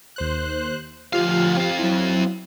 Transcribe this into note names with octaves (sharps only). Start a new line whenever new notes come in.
D#2 C5 F#6
D2 F3 F4 G4 F5
C4 F5
F#3 E4